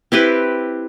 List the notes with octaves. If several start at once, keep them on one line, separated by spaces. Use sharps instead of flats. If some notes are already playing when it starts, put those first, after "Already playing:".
C4 E4 G4 B4